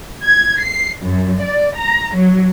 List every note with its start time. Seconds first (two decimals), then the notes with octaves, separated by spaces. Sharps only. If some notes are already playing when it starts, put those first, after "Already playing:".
0.24 G#6
0.62 C7
1.02 F#2
1.42 D5
1.77 A#5
2.16 F#3